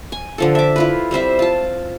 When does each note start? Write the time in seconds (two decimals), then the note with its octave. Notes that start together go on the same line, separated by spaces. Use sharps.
0.12 G#5
0.38 D3 F3 A4
0.55 E5 D6
0.76 E4 F4 B4
1.11 G3 C4 C5 E5
1.39 F4 A5